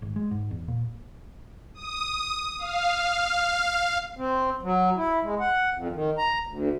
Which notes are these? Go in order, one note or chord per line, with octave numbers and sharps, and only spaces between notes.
G#1
G#3
G#2
E2
A#2
D#6
F5
C4
F#3
E4
G#3
F#5
F2
D#3
A#5
D2